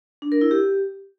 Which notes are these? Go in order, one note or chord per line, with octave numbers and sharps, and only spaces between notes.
D4
A#4
E4
G4